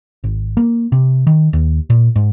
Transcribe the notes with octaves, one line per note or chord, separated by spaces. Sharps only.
G#1
A#3
C3
D#3
D#2
A#2
G#2